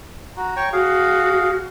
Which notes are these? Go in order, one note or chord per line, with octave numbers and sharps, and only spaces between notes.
F#4 A#5
C#5 G5 C#6
F#4 G#4 F5